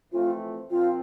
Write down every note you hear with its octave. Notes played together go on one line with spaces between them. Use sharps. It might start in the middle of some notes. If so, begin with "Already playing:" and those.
F2 E3 A3 C4 F4
A#2 F3 C4 F4